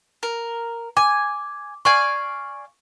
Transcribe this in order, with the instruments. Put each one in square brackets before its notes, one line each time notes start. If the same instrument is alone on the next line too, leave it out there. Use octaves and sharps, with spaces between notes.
[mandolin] A#4
[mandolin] G#5 [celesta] D6
[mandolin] D5 F5 G#5 [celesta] C#6